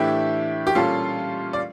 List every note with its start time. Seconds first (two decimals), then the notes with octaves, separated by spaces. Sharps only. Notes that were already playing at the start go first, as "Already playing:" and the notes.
Already playing: A2 E3 A3 D4 E4 G4
0.67 G4
0.75 A#2 G3 C#4 F4 A4
1.53 D5